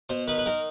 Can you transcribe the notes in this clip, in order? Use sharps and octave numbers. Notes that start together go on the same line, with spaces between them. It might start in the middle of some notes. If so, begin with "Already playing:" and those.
B2 C5
D#3 B4
B4
D#3 A#4